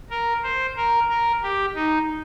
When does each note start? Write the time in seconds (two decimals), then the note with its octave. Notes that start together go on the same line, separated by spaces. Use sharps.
0.10 A#4
0.44 C5
0.76 A#4
1.09 A#4
1.43 G4
1.75 D#4